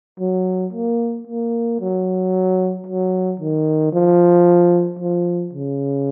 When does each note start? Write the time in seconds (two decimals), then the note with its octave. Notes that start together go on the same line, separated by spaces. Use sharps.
0.20 F#3
0.73 A#3
1.27 A#3
1.80 F#3
2.86 F#3
3.40 D#3
3.93 F3
4.99 F3
5.53 C#3